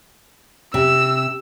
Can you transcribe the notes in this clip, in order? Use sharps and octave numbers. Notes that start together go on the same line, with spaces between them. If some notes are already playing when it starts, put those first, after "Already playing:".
C3 E6